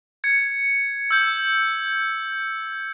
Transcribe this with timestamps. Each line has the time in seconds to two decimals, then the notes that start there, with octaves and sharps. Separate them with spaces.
0.24 G#6 C#7
1.11 E6 G6